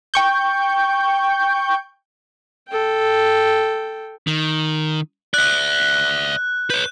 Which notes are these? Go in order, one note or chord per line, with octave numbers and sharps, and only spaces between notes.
G5 C#6 G6
A4 G5
D#3
D5 E5 F#6
B4 C#5 G6